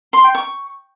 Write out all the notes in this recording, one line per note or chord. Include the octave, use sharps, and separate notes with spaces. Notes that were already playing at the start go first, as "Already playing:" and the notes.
C6
G5
C#6